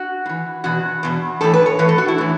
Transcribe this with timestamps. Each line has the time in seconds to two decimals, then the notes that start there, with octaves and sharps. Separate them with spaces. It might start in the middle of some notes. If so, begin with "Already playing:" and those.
Already playing: F#4
0.26 A2
0.29 E3
0.64 E2 B2 F#4
1.03 E2 B2
1.41 A2 E3 A4
1.54 B4
1.66 C#5
1.79 A2 E3 B4
1.89 A4
1.98 F#4
2.08 E4
2.18 A2 E3